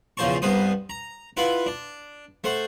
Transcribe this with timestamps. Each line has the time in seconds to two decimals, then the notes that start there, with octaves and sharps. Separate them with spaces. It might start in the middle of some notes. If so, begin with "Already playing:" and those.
0.17 E2 C#3 F3 C5 A5 C#6
0.42 C2 G2 B3 B4 C5 D#6
0.90 A#5
1.37 E4 F4 B4 F#5
1.66 D4
2.44 A3 C5 F#5